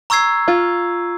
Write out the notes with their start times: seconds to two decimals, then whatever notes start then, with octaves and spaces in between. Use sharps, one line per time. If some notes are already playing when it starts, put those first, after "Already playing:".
0.10 A#5 C#6 E6 G#6 C7
0.48 F4